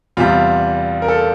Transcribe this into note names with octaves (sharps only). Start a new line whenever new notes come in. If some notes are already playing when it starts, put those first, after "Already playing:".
E2 C3 G3 F4
A#4
A4